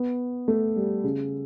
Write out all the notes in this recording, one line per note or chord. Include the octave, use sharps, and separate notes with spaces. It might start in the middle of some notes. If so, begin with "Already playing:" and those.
Already playing: B3
A3
G3
C#3